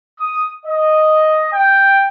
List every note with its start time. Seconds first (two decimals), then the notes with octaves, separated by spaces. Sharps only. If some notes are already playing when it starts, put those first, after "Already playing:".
0.18 D#6
0.65 D#5
1.52 G5